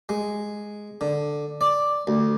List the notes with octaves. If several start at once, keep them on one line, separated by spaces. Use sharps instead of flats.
G#3
D3
D5
D2